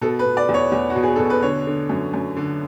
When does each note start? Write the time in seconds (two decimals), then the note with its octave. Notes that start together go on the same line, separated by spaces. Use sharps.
0.01 B2 A4
0.19 B4
0.26 B2
0.37 D5
0.49 E2
0.54 C#5
0.72 E2
0.90 F#4
0.96 B2
1.03 G#4
1.16 B2 A4
1.30 B4
1.42 D3 C#5
1.67 D3
1.90 F#2
2.14 F#2
2.37 D3